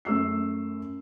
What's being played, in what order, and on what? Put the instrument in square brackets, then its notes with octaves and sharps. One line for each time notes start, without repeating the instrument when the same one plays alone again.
[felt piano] F#2 A3 E6 C7